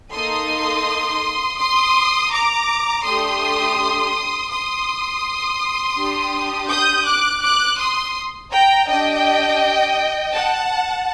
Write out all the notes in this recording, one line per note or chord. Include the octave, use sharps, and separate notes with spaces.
A#3 D#4 A4 C6 D#6
C6 D#6
A#5 D6
A3 D4 G4 C6 D#6
C6 D#6
D4 G4
D#6 G6
D6 F#6
D6 F#6
C6 D#6
G5 A#5
D4 G4 D#5 G5
F#5 A5